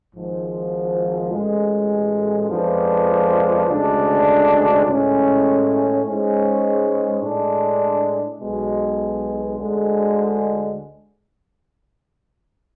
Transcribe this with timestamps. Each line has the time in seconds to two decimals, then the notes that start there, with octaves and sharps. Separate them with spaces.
0.14 G#1 G#2 F3
1.31 A1 A2 G#3
2.50 F2 F3 G#3 B3 D4
3.68 D2 C#3 G#3 D4
4.86 A2 G#3 C#4
6.03 G#2 G#3 C#4
7.21 A2 G#3 D4
8.39 B1 B2 G#3
9.57 D2 D3 G#3